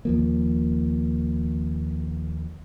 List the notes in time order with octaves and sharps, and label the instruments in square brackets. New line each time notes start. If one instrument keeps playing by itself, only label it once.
[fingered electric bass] D#2 F3 A#3